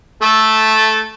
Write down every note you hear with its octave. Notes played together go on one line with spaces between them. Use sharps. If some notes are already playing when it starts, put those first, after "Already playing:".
A3 A4